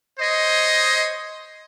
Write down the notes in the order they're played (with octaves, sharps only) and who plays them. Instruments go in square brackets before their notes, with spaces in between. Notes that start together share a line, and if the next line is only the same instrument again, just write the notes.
[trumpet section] C5 C#5 D#5